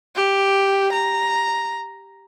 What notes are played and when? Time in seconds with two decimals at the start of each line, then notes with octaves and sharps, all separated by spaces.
0.16 G4
0.93 A#5